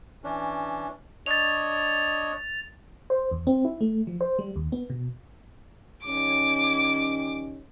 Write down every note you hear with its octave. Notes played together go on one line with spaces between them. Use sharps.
E3 C#4 D4
D4 C#5 D#5 A6 F7
C5
E2
C4
E4
A3
F3
C5
G3
D#2
B3
B2
D#3 G3 C#4 D6